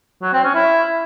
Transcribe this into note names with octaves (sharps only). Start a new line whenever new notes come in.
F#3
C4
C#4
E4